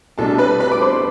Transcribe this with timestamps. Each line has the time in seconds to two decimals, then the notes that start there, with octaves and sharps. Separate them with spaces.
0.18 C2 B2 A3 D4 A4 A5
0.38 B4 B5
0.60 B4 B5
0.71 D6
0.81 C5 C6